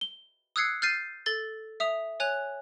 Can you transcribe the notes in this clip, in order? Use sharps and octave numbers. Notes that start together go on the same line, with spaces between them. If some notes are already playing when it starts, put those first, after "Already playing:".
G7
D#6 E6 F#6 G#6 C7 C#7
F6 G6 A6 C7 D#7
A4 A6 G7
E5 D#6 F7
C#5 G#5 F#6 F7